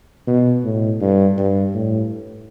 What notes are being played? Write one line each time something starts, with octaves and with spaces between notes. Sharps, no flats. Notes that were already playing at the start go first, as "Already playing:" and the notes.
B2
A2
G2
G2
A2